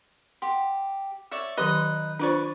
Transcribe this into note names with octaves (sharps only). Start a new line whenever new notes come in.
G4 F#5 C6
C#5 D5 E5
D#3 F#3 D#4 G4 B4 D#5
D4 F4 B4 C5 D5 C#6